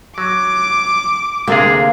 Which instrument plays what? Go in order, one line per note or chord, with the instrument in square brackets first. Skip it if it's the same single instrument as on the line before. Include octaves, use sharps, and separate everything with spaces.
[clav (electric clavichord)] F#3 [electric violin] D6
[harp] D2 F5 [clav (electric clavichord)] C3 D4 G#4 [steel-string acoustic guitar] A#3